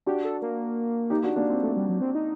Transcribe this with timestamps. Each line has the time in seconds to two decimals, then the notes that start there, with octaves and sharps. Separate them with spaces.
0.06 D4 F#4 G4
0.24 A4
0.42 A#3
1.10 D#4 G4
1.23 D4 F#4
1.36 A#3 D4
1.50 C4
1.62 A3
1.76 G3
1.89 F#3
2.01 C4
2.15 D#4